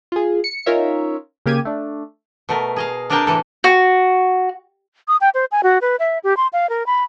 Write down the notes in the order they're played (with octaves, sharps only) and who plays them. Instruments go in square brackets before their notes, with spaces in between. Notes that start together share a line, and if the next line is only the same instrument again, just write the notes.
[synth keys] F4 G#4
C#7
C#4 D#4 F4 A#4 C#5 E5
C#3 A#3 G4 G#6 D#7
A3 D4
[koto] B2 A3 A#4
G#4 D#5 F5
C3 D4 G#4 A#4 G5 A5
A2 E3 A4
[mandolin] F#4
[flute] D#6
G5
C5
G#5
F#4
B4
E5
G4
C6
F5
A#4
B5